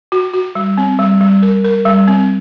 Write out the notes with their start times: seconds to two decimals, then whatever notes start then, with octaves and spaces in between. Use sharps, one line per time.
0.12 F#4
0.33 F#4
0.55 G3
0.78 C4
0.99 G3
1.21 G3
1.42 A#4
1.64 A#4
1.86 G3
2.08 C4